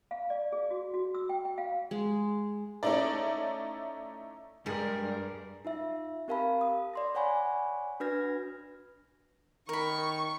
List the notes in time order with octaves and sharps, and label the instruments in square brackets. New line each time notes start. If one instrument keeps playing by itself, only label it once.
[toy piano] F5
D5
G#4
F#4
F#4
E6
G5
G5
F5
[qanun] G#3
[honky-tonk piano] A3 C#4 D#4 E4 D5
[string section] G2 [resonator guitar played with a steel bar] G3 G#4 [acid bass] G#3 [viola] A#4
[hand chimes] D#4 F4 E5
C4 G4 A#4 F5 A5 B5
D#6
D5 C6 A#6
C#5 D5 F#5 G#5 B5 C#6
D4 F#4 B4 F6 G#6 A#6
[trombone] D#3 [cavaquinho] A#4 B5 [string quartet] C#6